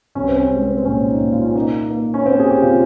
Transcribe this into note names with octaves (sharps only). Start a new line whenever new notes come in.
C2 C#4
C4
C#4
G#3
C4
C4
A#2 C#4
D#4
A#2
F4
C#4
A#3 D#4
A#3
C#4
A#3 C4
G#4
G4
C3 F4